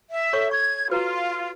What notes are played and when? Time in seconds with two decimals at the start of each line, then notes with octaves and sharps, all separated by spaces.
0.10 E5
0.33 A4 C#5 C#6
0.51 C#6 G#6
0.90 F4 F#4 B4 A#5